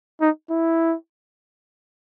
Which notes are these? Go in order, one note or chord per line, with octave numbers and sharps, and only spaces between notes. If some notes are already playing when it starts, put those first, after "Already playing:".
D#4
E4